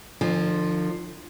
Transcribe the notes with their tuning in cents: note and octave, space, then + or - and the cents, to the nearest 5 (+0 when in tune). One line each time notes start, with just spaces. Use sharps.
D3 +40 F3 +0